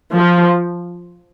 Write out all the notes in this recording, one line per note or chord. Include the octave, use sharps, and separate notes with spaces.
F3